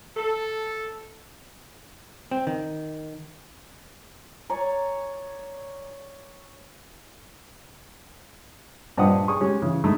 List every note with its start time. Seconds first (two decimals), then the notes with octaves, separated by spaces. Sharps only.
0.16 A4
2.31 C4
2.47 D#3
4.50 C#5 D5 G#5 A#5
8.98 G2 A#2 C5 D#5 F#5 D#6
9.28 G#4 C#6 D#6
9.41 G#3 C#4 G4 G#4
9.62 C#3 E3
9.84 G#3 A3 D#4 E4